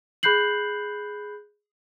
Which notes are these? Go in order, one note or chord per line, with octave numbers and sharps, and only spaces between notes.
G#4 B5 F#6 G6 C7 F#7